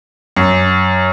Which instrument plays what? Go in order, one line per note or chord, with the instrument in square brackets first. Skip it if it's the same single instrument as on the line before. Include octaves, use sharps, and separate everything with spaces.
[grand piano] F#2